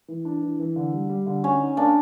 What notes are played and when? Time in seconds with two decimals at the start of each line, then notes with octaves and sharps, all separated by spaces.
0.08 E3
0.25 D4
0.42 E3
0.59 E3
0.76 D3
0.93 G3
1.09 G3
1.26 D3
1.43 C#4 F#4
1.60 D#4
1.77 A#3 D4